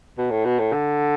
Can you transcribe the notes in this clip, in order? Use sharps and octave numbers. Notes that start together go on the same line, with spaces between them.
B2
A2
B2
A2
D3